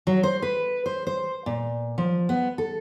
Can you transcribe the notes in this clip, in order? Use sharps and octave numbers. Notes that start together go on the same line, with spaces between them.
F#3
C5
B4
C5
C5
A#2
F3
B3
A4